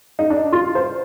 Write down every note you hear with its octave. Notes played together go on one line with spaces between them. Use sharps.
D#4
D4
F4
C5